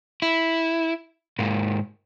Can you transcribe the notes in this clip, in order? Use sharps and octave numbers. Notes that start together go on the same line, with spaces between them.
E4
G#2 A#3